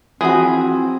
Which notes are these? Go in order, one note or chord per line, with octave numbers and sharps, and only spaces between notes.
E3 F3 C4 F#4 G#4